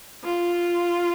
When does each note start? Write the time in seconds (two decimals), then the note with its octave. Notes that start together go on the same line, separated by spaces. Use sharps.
0.24 F4